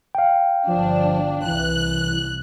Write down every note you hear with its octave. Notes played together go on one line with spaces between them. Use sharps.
F5 G5
G1 F3 D4
C2 E3 F#6